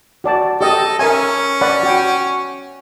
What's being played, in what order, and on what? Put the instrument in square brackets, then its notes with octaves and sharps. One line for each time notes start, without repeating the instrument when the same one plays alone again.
[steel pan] F#4 D5 A5
[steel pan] G4 D#5 [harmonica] A4
[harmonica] C#4 [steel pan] A#4 E5 G#5
[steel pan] D5 F#5 B5
F#4 G5